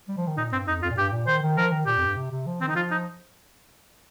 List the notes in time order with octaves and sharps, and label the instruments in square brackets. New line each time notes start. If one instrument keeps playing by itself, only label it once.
[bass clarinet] G3
F3
D#3
[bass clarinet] A#2 [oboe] D#4
[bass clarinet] G2 [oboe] C4
[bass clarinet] F2 [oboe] D#4
[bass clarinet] F2 [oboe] F4
[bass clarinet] A#2
[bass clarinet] G2 [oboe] G4
[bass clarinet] A#2
[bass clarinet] D#3 [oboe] C5
[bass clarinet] D#3
[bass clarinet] F3 [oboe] A#4
[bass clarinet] D#3
[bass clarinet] A#2 [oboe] G4
[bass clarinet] F2
G2
C3
C3
F3
[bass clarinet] D#3 [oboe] C4
[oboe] D#4
[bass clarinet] D#3
[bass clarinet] F3 [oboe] F4
[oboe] D#4